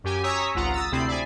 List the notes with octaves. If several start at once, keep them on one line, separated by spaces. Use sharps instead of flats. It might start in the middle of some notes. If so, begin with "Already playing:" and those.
F#2 G4 G#5
C#5 A#5 C#6 D#6 E6 B6
G#1 C#2 F4 F#5 A#5
D#6 E6 A6
D2 C3 C4 E4 B5 C7
D5 E5 G#5